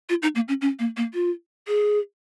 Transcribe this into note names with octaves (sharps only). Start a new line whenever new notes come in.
F4
D#4
A#3
C#4
C#4
A#3
A#3
F4
G#4